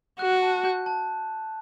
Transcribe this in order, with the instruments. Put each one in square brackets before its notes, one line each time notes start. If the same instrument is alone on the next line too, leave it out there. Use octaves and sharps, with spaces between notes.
[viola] F#4 [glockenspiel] F#6
[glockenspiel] A5
G6
A5